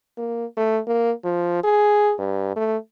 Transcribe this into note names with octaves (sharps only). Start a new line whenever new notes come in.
A#3
A3
A#3
F3
G#4
G2
A3